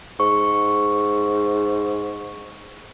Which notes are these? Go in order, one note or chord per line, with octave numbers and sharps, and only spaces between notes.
G#2 C#6